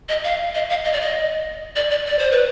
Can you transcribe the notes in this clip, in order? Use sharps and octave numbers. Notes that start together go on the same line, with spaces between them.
D#5
F5
D#5
F5
D#5
D5
D#5
D5
D5
D5
C5
B4